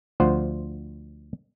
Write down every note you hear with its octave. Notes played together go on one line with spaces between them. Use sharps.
D2 F3 F4 C5 F#5